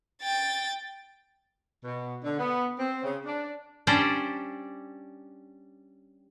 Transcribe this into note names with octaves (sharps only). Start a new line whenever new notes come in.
G5 A6
B2
D3
B3
C4
C#3
D4
G3 C#4 D4 G4 C5 D5